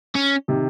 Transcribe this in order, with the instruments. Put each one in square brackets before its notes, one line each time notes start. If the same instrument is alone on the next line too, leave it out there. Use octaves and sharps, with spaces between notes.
[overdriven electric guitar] C#4
[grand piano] C3 D#3